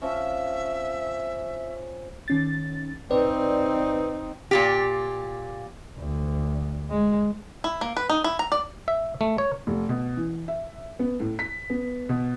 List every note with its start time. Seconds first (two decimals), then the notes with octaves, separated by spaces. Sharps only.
0.02 F3 C4 C#4 E5
2.28 D#3 C#4 A6
3.11 C4 D#4 B4 D5
4.51 A#2 F4 G4
5.98 D2
6.90 G#3
7.64 E4
7.81 A#3
7.97 B4
8.09 D#4
8.24 E4
8.39 A#5
8.52 D5
8.88 E5
9.21 A3
9.38 C#5
9.67 F1
9.89 B2
10.17 E3
10.48 E5
10.99 B3
11.20 A2
11.39 B6
11.70 B3
12.09 B2